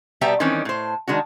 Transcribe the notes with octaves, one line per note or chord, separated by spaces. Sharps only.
B2 G3 B3 E5 G5 A#5
D#3 E3 G3 C4 C#4
A2 C5
D#3 G#3 D4 F#4